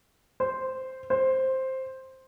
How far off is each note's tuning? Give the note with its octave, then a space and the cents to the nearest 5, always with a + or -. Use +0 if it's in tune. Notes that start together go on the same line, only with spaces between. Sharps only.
C5 -5
C5 +5